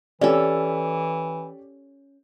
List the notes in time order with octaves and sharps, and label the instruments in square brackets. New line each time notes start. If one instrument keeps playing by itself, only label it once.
[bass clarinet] E3 [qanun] C#4 A4 [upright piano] G4 C#5 D5